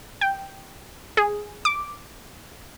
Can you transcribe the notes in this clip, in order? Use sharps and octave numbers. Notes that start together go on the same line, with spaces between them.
G5
G#4
D6